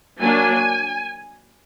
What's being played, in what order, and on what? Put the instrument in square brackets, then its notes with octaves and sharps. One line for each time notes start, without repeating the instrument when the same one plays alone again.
[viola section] F#3 A#3 D4 G#5